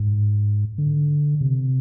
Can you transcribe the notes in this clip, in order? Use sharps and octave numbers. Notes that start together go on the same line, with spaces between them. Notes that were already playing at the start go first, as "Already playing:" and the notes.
Already playing: G#2
D3
C3